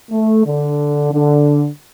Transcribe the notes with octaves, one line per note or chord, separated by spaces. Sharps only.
A3
D3
D3